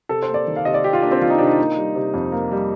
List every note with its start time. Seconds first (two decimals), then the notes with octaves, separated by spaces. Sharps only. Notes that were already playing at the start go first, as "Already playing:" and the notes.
0.09 C3 A4
0.23 C5
0.29 A#3
0.34 D5
0.47 D#3
0.56 F5
0.65 C3 D#5
0.74 D5
0.84 C3 G4
0.93 F4
1.02 A#3 D4
1.11 C4
1.22 D#3 F4
1.30 D#4
1.38 C3 D4
1.47 D#4
1.58 A#3
1.77 G3
1.95 C3
2.14 F2
2.32 A#3
2.51 G3